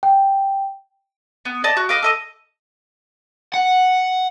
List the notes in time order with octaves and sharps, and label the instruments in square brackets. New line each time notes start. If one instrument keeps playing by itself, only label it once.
[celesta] G5
[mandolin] B3
D5 D#5 A5
F#4
B4 D#5 F5 D6
A4 D#5 D#6
[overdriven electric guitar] F#5